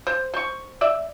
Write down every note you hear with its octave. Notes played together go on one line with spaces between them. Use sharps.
C5
C5 C#6
D5 E5